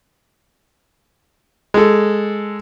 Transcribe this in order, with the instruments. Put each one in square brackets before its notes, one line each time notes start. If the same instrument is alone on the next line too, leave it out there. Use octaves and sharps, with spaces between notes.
[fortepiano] G#3 A4